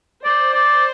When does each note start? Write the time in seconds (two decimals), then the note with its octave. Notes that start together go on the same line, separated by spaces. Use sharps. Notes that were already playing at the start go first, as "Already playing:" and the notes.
0.24 C5 D5
0.54 D5